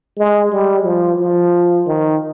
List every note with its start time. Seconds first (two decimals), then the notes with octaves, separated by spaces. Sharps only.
0.17 G#3
0.52 G3
0.85 F3
1.19 F3
1.86 D#3